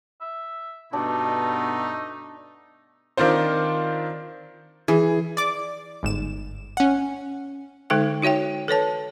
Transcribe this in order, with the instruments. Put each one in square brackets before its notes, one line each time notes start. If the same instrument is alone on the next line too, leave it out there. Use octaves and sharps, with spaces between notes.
[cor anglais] E5
[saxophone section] G2 B2 [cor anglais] A3 [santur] D4 [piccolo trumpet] D#4
[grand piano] D#3 C4 D4 F4 C5
[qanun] E3 [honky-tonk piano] G#4
[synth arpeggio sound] D5 D6
G1 G#2 E7
C#4 F#5
[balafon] D3 G#3 D#4 A4 G5
D#4 F#4 C#5 E5 G5
A4 B4 C#5 A5